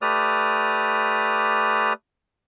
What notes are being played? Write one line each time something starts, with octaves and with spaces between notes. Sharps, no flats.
A3 G4 B4 D5 D#6 F6